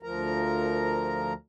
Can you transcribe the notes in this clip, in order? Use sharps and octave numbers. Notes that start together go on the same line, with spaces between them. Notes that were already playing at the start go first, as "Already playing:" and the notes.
D2 F3 A#4 A#5